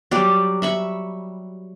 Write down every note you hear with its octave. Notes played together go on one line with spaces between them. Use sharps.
F#3 G3 G4 D5
E5 B5 C#6